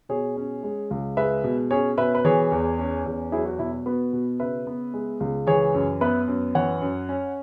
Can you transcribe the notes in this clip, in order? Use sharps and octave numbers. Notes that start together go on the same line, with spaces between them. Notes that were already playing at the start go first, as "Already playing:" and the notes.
B2 G#4 C#5
C#4
G#3
C#2
G#3 B4 E5
B2
C#4 G#4 C#5
B2 B4 E5
B4
E3 G#4 C#5
E2
C#4
E2
F#3 E4 G#4
F#4
B2 E4
F#4
B3 F#4 B4
B2
C#3 B4 E5
B3
G#3
C#2
E3 G#4 C#5
F#2
B3 B4 E5
F#2
E3 C#5 F#5
F#2
C#4